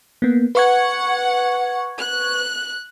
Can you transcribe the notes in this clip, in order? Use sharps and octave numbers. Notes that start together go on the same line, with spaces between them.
A#3 B3
B4 F#5 C#6 G#6
F#6